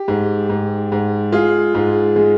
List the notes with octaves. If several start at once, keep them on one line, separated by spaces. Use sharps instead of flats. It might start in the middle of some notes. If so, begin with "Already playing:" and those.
Already playing: G4
G#2
G#2
G#2
G#3 F4 G#4
G#2
G#3